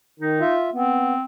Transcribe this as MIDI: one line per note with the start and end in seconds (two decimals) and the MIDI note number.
0.20 0.39 51
0.20 0.56 63
0.40 0.70 65
0.40 0.70 76
0.74 1.14 59
0.74 1.25 60